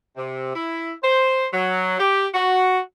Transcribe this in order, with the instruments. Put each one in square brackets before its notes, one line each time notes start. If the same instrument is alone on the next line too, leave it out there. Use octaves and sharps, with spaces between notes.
[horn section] C3
E4
C5
F#3
G4
F#4